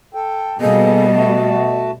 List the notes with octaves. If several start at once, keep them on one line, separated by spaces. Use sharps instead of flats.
A4 G5
B2 G3 A#3 G#4 A4 D#5
A3 F#4 A5